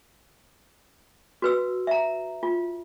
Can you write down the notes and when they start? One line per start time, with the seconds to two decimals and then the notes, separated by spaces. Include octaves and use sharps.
1.42 F#4 B4 E6
1.87 E5 A#5
2.43 F4